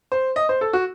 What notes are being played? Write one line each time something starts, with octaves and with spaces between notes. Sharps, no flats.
C5
D#5
C5
A4
F#4